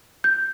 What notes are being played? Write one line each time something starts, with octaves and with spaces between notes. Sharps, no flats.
G6